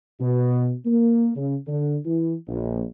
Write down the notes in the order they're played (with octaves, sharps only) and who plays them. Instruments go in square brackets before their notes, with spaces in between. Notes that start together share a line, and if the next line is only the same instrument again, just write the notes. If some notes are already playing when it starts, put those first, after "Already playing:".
[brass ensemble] B2
A#3
C#3
D3
E3
A#1